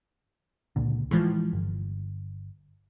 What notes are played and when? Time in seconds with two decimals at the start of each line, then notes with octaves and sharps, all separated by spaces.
0.76 C#2 A#2 D3
1.11 A2 E3 F3 G#3
1.53 G1